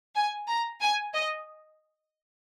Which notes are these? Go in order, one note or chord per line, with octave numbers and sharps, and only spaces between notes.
G#5
A#5
G#5
D#5